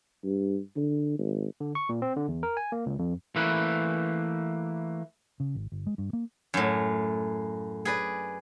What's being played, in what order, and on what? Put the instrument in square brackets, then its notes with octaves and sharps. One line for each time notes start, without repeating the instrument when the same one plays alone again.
[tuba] G2
D3
G#1
[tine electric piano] D3
C#6
A#2
C4
D3
E2
A#4
G#5
A#3
C#2
F2
[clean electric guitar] E3 A3 A#3 B4
[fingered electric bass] C#3
G#1
G1
G#3
G2
A#3
[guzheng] F#2 A2
G#4 B4 D5